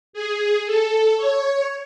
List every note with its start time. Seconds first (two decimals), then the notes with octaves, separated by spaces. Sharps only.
0.13 G#4
0.65 A4
1.17 C#5